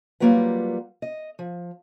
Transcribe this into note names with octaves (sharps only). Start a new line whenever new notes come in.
F#3 G3 A#3 F4 B4 F#5
D#5
F3